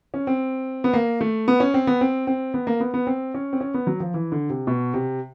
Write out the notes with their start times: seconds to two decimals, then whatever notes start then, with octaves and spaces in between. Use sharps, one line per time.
0.14 C#4
0.27 C4
0.84 B3
0.93 A#3
1.21 A3
1.48 B3
1.60 C#4
1.74 C4
1.87 B3
2.01 C4
2.27 C4
2.54 B3
2.67 A#3
2.80 B3
2.94 B3
3.07 C4
3.34 C#4
3.53 C4
3.61 C#4
3.74 B3
3.87 F#3
4.00 F3
4.14 E3
4.32 D3
4.50 C3
4.67 B2
4.94 C3